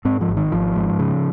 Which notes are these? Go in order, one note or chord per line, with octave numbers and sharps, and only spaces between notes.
G#2 C4
F3
G#1
D#3
G#1 F3
G#2
C#3